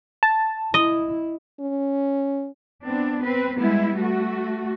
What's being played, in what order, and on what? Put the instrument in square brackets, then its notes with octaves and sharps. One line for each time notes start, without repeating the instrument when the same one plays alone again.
[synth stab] A5
[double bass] E4 [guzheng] D#5
[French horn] C#4
[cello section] B3 C4 D4
C4 B4
G3 G#3 B3 E4
A3 F#4